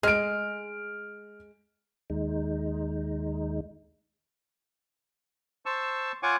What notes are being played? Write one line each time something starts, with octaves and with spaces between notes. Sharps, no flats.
G#3 F6 D7
D#2 G#3 D#4
C5 A5 C#6 E6
F4 C#5 F#5 G#5 C#6 D6